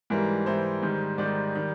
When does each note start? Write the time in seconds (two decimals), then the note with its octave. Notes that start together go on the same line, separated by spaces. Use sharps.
0.10 G#2 E3 G3 A#4
0.46 G#2 E3 G3 C5
0.82 G#2 D#3 G3
1.18 G#2 D#3 G3 D5
1.55 D#3 G3